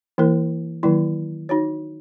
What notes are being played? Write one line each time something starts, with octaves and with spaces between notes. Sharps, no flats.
E3 A#3 E4 A#4
D#3 F#3 A#3 E4
D#4 F#4 C#5